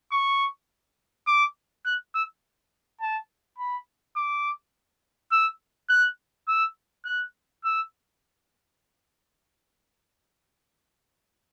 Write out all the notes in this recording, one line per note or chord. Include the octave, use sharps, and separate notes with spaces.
C#6
D6
F#6
E6
A5
B5
D6
E6
F#6
E6
F#6
E6